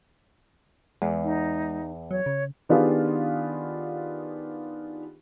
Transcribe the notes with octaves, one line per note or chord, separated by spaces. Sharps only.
E2 G#3
D#4
F#3 C#5
C#3
D#3 B3 D4 F4 G4 G#4